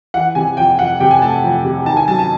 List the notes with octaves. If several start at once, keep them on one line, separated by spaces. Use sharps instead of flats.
E3 F#5
C3 G#5
F2 G5
F2 F#5
C3 G5
G#5
A3 A5
F2
C3
D#3 A5
G#5
F#2 A5
A5